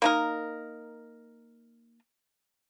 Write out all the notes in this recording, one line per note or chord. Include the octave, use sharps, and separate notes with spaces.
A#3 D#4 A#4